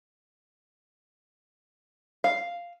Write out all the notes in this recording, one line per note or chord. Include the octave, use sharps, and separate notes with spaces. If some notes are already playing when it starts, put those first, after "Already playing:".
F5